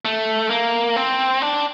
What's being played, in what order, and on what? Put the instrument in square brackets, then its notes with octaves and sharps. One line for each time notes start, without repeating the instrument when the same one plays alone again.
[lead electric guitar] A3
A#3
C4
D4